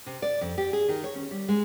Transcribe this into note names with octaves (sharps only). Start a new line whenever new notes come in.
C3
D5
F2
G4
G#4
D#3
C#5
C#4
G3
G#3